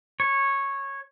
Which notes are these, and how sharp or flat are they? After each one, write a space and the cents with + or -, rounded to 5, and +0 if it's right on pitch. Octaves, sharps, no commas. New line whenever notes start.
C#5 -10